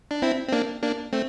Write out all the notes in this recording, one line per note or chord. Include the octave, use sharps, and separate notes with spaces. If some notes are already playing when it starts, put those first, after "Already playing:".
D4
C4 E4
C4
A#3 D4
A#3 D4
A3 C4